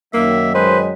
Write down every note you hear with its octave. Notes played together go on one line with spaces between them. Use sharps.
F#2 D#3 F#3 A#3 E5
G#3 B4 C5